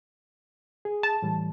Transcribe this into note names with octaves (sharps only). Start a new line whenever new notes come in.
G#4
A5
A2 E3 G3